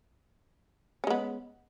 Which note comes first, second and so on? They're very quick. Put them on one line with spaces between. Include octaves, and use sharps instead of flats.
C#4 G#3 B3